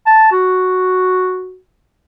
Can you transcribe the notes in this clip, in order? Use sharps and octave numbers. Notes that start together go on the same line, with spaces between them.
A5
F#4